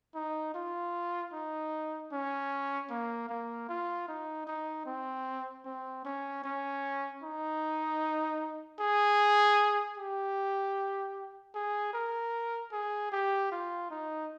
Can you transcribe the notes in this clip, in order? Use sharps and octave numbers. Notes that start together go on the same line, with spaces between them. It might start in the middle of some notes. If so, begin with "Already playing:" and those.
D#4
F4
D#4
C#4
A#3
A#3
F4
D#4
D#4
C4
C4
C#4
C#4
D#4
G#4
G4
G#4
A#4
G#4
G4
F4
D#4